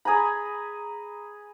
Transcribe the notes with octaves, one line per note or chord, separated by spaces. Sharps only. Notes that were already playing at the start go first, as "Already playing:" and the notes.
G#4 G#5 A#5 B5